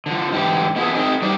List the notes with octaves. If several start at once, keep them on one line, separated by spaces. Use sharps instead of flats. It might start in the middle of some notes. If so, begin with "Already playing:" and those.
D3 F3
G#2 D3 E3 G4
A3 B3 E4 F4 G#4
C4 D#4 E4 G#4 A#4
G3 D4 D#4 F#4 G4 D5